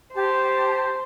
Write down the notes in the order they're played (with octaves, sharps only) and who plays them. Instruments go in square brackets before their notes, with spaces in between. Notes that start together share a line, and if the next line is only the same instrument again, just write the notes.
[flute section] G4 A5 [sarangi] C5